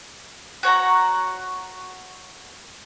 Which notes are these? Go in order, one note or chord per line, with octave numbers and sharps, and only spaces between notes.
F#4 C#5 F#5 A#5